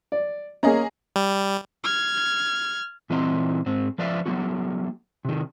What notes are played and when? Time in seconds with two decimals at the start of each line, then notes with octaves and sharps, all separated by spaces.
0.12 D5
0.63 A#3 C#4 G#4 D#5 A#5
1.16 G3
1.84 F6 G#6
3.10 A#2 E3 C4 D#5 A#5
3.66 G#2 C4
3.98 F3 B4 D5 E5 F5
4.26 F#3 A#3 B3 F#4
5.25 C3 D#3